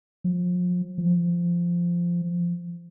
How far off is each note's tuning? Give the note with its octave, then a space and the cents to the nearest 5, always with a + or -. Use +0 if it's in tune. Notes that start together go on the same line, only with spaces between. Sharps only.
F3 +35
F3 -10